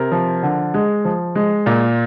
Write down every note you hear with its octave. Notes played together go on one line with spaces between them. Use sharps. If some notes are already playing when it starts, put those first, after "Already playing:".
Already playing: C3 A#4
F3
D3
G#3
F3
G#3
A#2